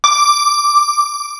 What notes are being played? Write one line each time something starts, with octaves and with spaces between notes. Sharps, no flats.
D6